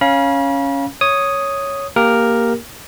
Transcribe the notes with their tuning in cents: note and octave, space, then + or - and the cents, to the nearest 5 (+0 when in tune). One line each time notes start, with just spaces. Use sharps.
C#4 +0 F5 +0 B5 -40
C#5 +0 D#6 +0
A#3 +0 G4 +10 A#4 +0